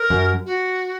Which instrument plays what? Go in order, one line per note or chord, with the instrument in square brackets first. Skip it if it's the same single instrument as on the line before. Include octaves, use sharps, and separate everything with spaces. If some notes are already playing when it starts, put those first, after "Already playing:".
Already playing: [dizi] A#4
[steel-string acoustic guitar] F#2
[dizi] F#4